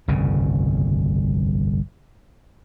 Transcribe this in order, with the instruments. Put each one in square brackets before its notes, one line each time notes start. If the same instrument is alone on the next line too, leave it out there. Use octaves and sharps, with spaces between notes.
[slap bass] G1 C2 F2 C#3